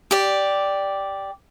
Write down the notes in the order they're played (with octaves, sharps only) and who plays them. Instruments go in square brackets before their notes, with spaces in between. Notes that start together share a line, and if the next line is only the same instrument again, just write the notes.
[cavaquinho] G4 D5